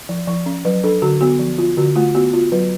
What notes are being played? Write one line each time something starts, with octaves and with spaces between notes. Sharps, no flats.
F3
F3
C#4
F#3 B4
D4 A4
D3 F#4
B3 F#4
F3
F4
D3 F#4
A3 F4
B3 F#4
F4
F#3 B4